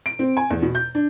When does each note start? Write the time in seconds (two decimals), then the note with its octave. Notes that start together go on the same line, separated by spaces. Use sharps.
0.06 D7
0.19 C4
0.37 G#5
0.50 E2
0.62 B2
0.75 G6
0.95 D4